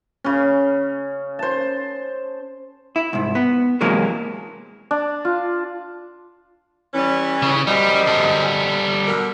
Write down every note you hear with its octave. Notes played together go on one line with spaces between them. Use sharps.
C#3 C#4
C5 A5
E4
C2 G#2
B3
C3 E3 F#3 G#3 A#3
D4
F4
E3 G3 C#4
C#3
F#2 G3 C5 D#5
G3 A4
B2 D3 A#4